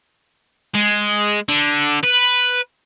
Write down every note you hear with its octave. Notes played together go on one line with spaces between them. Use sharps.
G#3
D3
B4